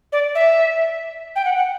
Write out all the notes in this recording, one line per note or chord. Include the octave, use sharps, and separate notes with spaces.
D5
E5
G5
F#5
F#5